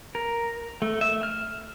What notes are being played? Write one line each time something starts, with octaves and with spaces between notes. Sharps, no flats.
A#4
A3
E5
F6